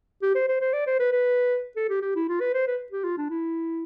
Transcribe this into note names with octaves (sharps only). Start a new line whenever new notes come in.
G4
C5
C5
C5
D5
C5
B4
B4
A4
G4
G4
E4
F4
B4
C5
B4
G4
F4
D4
E4